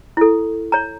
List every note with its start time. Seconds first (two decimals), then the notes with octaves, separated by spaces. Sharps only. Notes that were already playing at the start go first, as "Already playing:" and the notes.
0.17 E4 A4
0.72 C#5 A#5